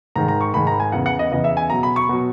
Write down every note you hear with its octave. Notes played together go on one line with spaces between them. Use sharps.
G#2 D#3 G#3 A#5
A#5
C#6
G#2 D#3 G#3 B5
A#5
G#5
E2 C#3 E3 F#5
F#5
D#5
E2 C#3 E3 D#5
E5
G#5
B2 F#3 A#5
B5
C#6
B2 F#3